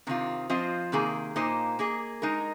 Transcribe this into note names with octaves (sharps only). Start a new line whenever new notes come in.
C3 D#3 C4 F4
F3 C4 F4 C5 D#5
C3 D#3 A#3 G#4
A#2 A#3 D#4 C5 D#5
A#3 G#4 D#5
G#3 D#4 A#4